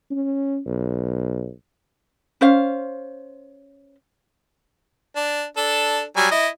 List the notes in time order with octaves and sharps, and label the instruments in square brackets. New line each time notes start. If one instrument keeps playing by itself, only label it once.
[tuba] C#4
B1
[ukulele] C#4 C5 F5
[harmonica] D4
D4 A4
F#3 G3 G#5
E4 D#5